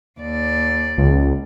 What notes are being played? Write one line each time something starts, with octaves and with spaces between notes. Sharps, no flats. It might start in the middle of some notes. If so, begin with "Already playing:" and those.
D#2 D5
C#2